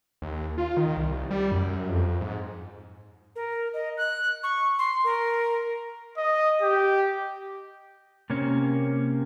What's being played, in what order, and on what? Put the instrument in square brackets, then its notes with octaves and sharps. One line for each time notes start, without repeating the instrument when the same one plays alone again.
[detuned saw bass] D#2
F4
D#3
C2
G3
F#2
F2
G#2
[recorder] A#4
D#5
F#6
C#6
C6
A#4
[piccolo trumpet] D#5
G4
[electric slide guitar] C3 A#3 C#4